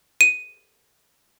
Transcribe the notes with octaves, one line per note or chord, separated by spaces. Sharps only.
D#7